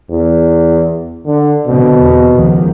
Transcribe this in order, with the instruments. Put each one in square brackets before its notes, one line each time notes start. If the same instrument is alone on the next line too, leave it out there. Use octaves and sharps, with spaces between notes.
[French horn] E2
D3
[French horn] B2 [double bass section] D3 C4
[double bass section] E2
C#2 D#3 F3